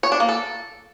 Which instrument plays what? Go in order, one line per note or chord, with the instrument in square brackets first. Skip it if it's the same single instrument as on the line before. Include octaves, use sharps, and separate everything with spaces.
[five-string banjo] C#5
D4
A#3
A4